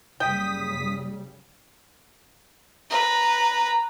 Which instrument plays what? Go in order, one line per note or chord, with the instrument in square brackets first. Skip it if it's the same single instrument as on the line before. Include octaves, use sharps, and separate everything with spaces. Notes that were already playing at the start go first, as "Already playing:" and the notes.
[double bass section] F#1 C#3 G3 [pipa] G5 [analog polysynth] D#6 B6
[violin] B4 A#5